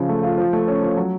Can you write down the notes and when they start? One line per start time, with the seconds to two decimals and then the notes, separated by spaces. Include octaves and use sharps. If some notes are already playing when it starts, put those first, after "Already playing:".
Already playing: C#3 F3
0.09 A3
0.23 F4
0.37 F3
0.53 A3
0.68 C#4
0.82 F3
0.97 F#3